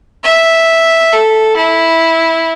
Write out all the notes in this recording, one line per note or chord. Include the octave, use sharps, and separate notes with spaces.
E5
A4
E4